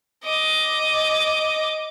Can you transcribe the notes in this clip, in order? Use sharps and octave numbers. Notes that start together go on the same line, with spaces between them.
D#5 D6